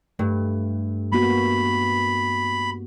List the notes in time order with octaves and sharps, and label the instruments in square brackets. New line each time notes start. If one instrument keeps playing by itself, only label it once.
[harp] G2 [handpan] A3
[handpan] A#3 B3 F#4 [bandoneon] B5